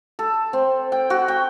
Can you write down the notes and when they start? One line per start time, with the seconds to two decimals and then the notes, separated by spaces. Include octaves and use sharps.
0.19 A4
0.53 C4
0.92 G5
1.10 F#4
1.28 G5